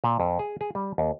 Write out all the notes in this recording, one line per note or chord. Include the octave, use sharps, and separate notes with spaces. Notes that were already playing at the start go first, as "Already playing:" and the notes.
A#2
F2
G#4
G#4
G3
D#2